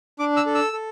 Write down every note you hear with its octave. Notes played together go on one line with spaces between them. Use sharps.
D4 D6
E6
A4
E6
A4